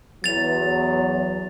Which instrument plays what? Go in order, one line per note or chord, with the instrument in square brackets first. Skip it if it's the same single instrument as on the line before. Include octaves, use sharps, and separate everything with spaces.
[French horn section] E2 F#3 [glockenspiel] A6 F7